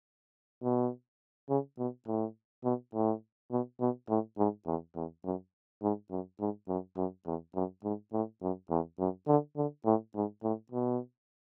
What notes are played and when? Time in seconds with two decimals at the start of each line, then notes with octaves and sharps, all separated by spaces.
0.63 B2
1.49 C#3
1.79 B2
2.07 A2
2.64 B2
2.94 A2
3.51 B2
3.80 B2
4.09 A2
4.38 G#2
4.66 E2
4.96 E2
5.25 F#2
5.82 G#2
6.11 F#2
6.40 G#2
6.68 F#2
6.97 F#2
7.26 E2
7.55 F#2
7.84 G#2
8.13 A2
8.42 F#2
8.70 E2
8.99 F#2
9.28 D3
9.57 D3
9.85 A2
10.15 G#2
10.43 A2
10.72 B2